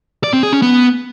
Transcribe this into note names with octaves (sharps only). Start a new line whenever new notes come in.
D5
C4
G#4
C#4
B3